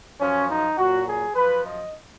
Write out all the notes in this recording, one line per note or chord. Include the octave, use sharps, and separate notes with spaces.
F#2 F3 C#4
D#4
A#2 F#3 F#4
G#4
F#2 F3 B4
D#5